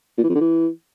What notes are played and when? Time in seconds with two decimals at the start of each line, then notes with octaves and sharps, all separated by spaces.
0.18 A#2
0.24 E3
0.29 F2
0.35 D3
0.41 E3